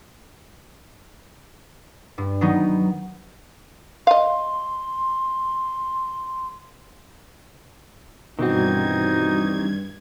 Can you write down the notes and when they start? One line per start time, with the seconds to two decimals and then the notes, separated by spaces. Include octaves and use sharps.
2.18 G2
2.41 D#3 F#3 B3 D#4
4.07 D#5 F5 C6
8.39 G2 B2 D#3 E3 C4 D#4 F#4 G#6